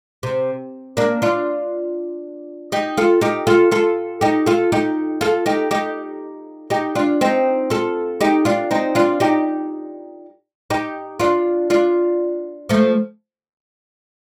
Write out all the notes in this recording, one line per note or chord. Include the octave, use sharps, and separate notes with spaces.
C3
A#3 D4
D4 F4
D#4 G4
F4 A4
D#4 G4
F4 A4
F4 A4
D#4 G4
F4 A4
D#4 G4
F4 A4
D#4 G4
D#4 G4
D#4 G4
D4 F4
C4 D#4
F4 A4
D#4 G4
D4 F4
C4 D#4
D4 F4
D#4 G4
D#4 G4
D4 F4
D4 F4
F3 A3